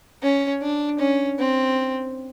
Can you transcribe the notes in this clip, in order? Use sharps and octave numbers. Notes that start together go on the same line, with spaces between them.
C#4
D4
C#4
C4